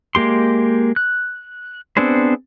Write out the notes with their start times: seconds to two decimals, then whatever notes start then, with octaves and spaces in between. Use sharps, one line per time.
0.15 G#3 A#3 G4 C6
0.96 F#6
1.97 B3 C4 D4 G#4 C5